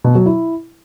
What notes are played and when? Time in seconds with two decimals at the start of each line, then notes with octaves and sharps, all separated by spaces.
0.04 B2
0.15 F#3
0.26 E4